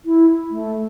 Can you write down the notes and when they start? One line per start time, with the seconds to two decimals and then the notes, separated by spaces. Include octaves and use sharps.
0.05 E4
0.51 A3